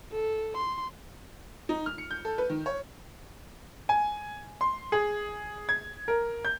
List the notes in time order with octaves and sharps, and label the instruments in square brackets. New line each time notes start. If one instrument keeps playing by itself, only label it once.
[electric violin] A4
C6
[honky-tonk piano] D#4
F6
C#7
G6
A4
B4
D#3
C#5
[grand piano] G#5
C6
G#4
G#6
A#4
G6